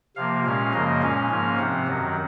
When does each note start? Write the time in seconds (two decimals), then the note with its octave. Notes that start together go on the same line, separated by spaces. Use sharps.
0.16 C3 F3 A#3 F5
0.44 A#2 G#3 C#4 F5
0.73 F#2 C#3 F3 A#3 D#5
1.02 A#2 G#3 C#4 F5
1.30 G#2 F3 A#3 C#4
1.59 C3 F3 C4 F#5
1.88 F#2 D#3 F#3